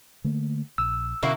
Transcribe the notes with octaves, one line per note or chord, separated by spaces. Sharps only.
D3 A3 A#3
A#1 E6
B2 D3 A#3 C#4 E4 F#4